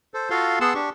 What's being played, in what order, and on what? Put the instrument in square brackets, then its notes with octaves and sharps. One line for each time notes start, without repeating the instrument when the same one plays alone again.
[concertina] A4 C5
F4 F#4 A4 F5 C6
B3 G#4 F#5 A5 C6 E6
D4 G4 C#6